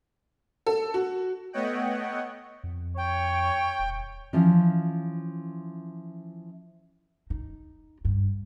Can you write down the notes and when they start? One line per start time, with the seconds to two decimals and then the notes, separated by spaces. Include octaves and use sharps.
0.66 A4
0.94 F#4
1.53 A3 B3 C#5 D#5 F#5 G5
2.64 F2
2.97 C#5 G5
3.79 D#1
4.33 E3 F3 C#4 F4
7.30 D#4
8.05 G2